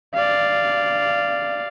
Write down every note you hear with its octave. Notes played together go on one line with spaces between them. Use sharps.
D5 F5